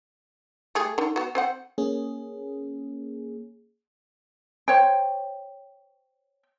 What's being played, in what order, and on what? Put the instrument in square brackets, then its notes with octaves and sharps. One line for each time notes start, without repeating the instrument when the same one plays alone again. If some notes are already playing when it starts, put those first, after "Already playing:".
[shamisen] G3 A3 G#4
D3 D#3
B3 F#4
C4 C5 F#5
[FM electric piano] A#3 C#4 G#4
[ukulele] C5 C#5 G5